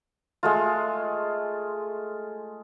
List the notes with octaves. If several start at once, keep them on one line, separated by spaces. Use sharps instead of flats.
G#3 A3 F4